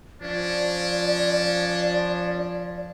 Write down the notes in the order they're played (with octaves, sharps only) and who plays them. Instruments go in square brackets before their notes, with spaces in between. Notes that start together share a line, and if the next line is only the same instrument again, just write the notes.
[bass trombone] F3 [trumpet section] C#4 D4 [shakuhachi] D5